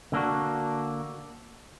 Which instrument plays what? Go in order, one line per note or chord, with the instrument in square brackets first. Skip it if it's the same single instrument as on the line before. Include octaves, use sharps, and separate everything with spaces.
[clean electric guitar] D3 A#3 D4 F#4